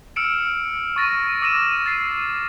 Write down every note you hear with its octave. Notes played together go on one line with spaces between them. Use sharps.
E6 F6 C#7 D7 E7
C#6 A6 A#6 D#7
D6 E6 F6 A#6 D#7 E7
A6 C7 D#7